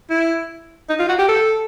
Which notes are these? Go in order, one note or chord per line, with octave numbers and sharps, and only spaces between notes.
E4
D#4
F4
F#4
G4
A4